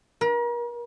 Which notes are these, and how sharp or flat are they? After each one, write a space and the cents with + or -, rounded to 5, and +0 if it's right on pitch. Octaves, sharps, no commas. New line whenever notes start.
A#4 +40